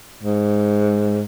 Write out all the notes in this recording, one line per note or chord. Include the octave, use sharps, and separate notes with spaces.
G#2